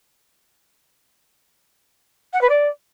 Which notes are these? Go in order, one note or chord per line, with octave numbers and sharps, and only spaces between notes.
F#5
B4
D5